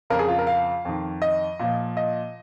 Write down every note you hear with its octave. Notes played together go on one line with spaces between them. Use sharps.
F2 C#3 F3 A#4
G#4
F4
A#4
F5
F2 D#3
D#5
A#2 F3
D#5